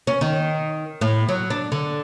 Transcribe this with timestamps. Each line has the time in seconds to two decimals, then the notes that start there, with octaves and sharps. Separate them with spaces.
0.07 C#4
0.21 D#3
1.01 A2
1.29 F#3
1.50 D4
1.72 D3